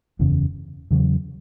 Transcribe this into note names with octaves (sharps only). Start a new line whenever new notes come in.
F#1 E2 C#3
E2 C#3 F#3